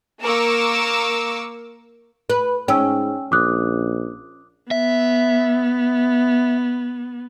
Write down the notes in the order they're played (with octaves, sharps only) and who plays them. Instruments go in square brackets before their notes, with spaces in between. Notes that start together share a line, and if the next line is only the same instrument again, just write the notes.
[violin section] A#3 A#4 C#6 D6 E6
[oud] B4
[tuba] G#2 [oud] C#4 [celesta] G5 E6
[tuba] A#1 [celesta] D6 D#6 F#6
[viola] B3 [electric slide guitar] E5